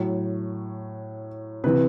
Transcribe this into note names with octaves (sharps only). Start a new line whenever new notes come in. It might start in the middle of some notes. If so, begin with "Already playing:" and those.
Already playing: A2 F#3
C3 E3 B4